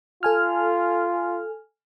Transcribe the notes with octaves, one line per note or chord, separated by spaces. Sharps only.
F4 A4 G#5 F6